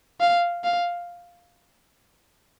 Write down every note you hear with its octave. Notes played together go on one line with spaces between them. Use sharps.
F5
F5